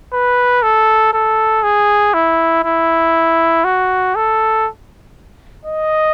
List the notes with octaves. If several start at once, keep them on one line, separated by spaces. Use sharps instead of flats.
B4
A4
A4
G#4
E4
E4
F#4
A4
D#5